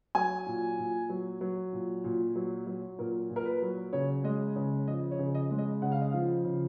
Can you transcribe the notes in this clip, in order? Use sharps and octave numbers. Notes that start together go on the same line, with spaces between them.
F#3 G#5
A#2
A#2
F#3
F#3
A#2
A#2
F#3
F#3
A#2 A#4
A#2
A#4
B4
F#3
C#3 C#5
G#3 D#5
C#3 C#5
F3 D#5
C#5
C#3
D#5
G#3
D#5
C#3 F#5
F5
D#5
F3 F5
C#3